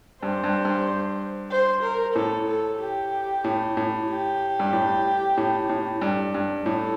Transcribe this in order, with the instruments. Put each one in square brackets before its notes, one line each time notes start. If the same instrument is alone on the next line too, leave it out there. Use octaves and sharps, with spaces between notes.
[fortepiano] G2 [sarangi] C5
[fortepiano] G2
G2
[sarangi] C5
A#4
[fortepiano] A2 [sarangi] A4
[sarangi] A4
G4
[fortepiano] A2
A2
[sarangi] G4
[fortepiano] G2
A2
A2
A2
G2
G2
[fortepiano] A2 [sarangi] A4